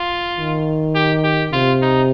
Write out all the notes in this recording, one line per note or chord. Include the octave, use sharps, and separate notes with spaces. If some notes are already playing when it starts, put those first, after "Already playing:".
Already playing: F4
D#3
G4
G4
C3 F4
D#4